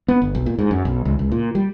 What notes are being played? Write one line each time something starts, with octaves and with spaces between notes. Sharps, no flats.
B3
G1
B1
A#2
G#2
F#2
B1
C#2
C#2
A#2
G3